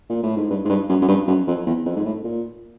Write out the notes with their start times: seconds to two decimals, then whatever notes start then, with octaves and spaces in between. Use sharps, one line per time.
0.10 A#2
0.23 A2
0.37 G#2
0.50 G2
0.65 G#2
0.69 G2
0.89 F#2
1.02 F#2
1.08 G2
1.27 F#2
1.47 F2
1.66 E2
1.86 F2
1.96 G#2
2.06 A2
2.24 A#2